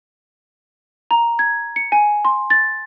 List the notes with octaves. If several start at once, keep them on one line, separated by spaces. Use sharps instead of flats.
A#5
G#6
C#7
G#5
C6
A6